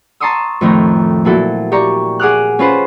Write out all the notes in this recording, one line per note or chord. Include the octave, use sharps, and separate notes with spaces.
A5 A#5 C6 C#6 D#6 E6
F2 A2 D#3 D#4 A#5
A#2 F#3 E4 F#4 A4
G4 D5 A#5 C#6
G#4 F#5 D6 F6 F#6
C#4 F4 B4 C5